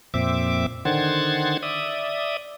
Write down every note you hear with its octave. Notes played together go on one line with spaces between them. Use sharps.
F2 A#2 C4 E5 D6
D3 D#3 C5 F#5 G#6 A6
D5 E5 D#6